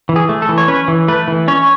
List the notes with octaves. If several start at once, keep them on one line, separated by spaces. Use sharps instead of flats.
E3
G#4
A3
A4
E3
C#5
C#4 B4
E3
A3 B4
E3
C#4 C#5